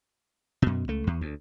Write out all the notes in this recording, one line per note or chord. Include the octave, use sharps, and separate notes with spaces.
F#2 B2
C#2 A3
E2
D2